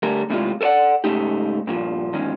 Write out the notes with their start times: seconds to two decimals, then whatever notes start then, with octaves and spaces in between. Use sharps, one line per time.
0.03 D3 G3 A3 G#4 A#4
0.30 D#2 A2 C3 G3 G#3 F4
0.61 A4 A#4 C#5 D5 F#5
1.04 G#2 C#3 A3 D#4 G4
1.67 G2 A#2 F3
2.13 E2 G#2 D#3 F3 C#4